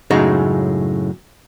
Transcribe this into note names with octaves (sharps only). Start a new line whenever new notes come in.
F#2 A2 C#3 G#3 D#4